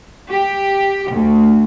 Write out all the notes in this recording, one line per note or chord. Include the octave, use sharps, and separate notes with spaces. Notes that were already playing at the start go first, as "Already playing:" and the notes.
G4
D2